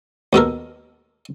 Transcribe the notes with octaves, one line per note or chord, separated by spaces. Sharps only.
D#2 B2 A4 A#4